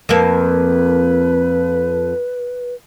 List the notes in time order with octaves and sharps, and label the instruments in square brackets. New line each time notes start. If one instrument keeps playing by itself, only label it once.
[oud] F2 A#3 [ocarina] B4